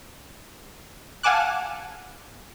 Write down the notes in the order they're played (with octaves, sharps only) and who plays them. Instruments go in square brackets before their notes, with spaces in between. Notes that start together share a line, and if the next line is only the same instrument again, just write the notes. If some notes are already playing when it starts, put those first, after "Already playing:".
[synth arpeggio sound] F5 F#5 G#5 A5 D6 F#6